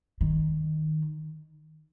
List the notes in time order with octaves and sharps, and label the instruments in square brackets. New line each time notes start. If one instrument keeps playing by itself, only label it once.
[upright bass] D#3